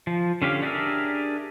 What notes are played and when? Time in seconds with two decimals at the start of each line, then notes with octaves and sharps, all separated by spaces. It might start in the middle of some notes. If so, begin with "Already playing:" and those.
0.07 F3
0.42 D3 C#4 G4 F5
0.63 D4 G4 G#4 A#4 E5